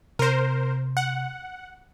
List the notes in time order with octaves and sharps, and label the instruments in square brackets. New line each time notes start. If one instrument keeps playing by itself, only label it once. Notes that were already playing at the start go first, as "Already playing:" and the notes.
[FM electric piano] C3 [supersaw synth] A#4 C5
[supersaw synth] F#5